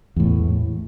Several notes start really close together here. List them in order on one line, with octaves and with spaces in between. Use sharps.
E2 A2 E3